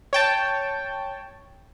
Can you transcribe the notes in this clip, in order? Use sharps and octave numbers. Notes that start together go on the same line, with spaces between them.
C#5 G5 A5